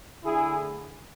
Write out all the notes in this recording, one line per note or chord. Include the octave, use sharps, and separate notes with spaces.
D3 A3 E4 G#4